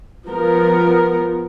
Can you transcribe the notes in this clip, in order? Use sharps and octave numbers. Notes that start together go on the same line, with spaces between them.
F3 B3 A#4